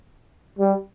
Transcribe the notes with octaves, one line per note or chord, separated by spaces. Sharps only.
G3